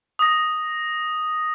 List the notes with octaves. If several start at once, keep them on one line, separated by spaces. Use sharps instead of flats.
D#6 A#6